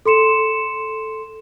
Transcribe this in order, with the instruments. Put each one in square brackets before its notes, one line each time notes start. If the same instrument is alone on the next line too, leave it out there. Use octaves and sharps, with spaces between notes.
[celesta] A4 C6 C#7 E7